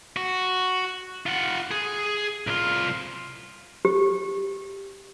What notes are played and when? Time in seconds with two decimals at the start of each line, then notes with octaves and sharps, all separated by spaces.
0.17 F#4
1.26 F4 F#5
1.71 G#4
2.47 C2 F4
3.85 G4